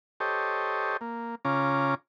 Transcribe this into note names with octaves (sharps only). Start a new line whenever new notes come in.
G4 A4 C5 C#5 D#5
A#3
C#3 C#4 F4 A#5 D6